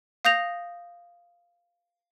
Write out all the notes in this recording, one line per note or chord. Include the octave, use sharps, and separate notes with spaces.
F5 D#6 G6 A#6 F7